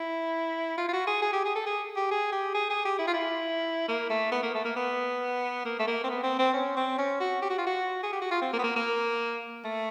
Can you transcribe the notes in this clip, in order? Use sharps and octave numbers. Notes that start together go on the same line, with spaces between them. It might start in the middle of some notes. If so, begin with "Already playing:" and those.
Already playing: E4
F4
F4
F#4
G#4
G#4
G4
G#4
A4
G#4
G4
G#4
G4
G#4
G#4
G4
E4
F4
E4
A#3
A3
B3
A#3
A3
A#3
B3
A#3
A3
A#3
C4
B3
C4
C4
C#4
C4
C#4
F#4
G4
F#4
F4
F#4
G#4
G4
F#4
F4
C4
A#3
B3
A#3
A#3
A3